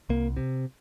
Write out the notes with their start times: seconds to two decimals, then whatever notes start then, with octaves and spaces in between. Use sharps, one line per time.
0.09 C2 A#3
0.37 C3